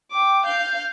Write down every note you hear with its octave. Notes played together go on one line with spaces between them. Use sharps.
G5 D6
F5 G6